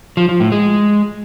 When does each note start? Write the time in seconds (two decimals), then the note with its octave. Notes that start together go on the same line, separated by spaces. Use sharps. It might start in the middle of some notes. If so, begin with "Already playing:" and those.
0.17 F3
0.29 F3
0.40 A2
0.52 G#3